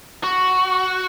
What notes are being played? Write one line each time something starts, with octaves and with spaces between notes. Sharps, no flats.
F#4